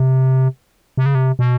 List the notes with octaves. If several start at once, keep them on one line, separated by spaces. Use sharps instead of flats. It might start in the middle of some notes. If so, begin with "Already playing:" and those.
Already playing: C3
C3
C#3
C3
B2